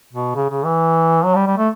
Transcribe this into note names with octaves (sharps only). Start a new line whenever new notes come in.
B2
C#3
C#3
E3
F#3
G3
G3
A3